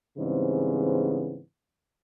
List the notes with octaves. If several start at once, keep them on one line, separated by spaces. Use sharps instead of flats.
G#2 C#3 E3 G3 B3 C4